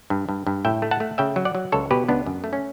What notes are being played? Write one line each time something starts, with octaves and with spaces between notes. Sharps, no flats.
G2
G2
G2
A2 E5 G5
A3
F#5 A5
A3
C#3 E5 G5
F#3
D5 F#5
F#3
C#2 A4 C#5
B2 G4 B4
C#2 B3 D4
F#2
A3
C#4